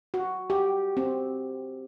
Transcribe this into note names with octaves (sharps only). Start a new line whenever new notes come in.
F#4
G4
C4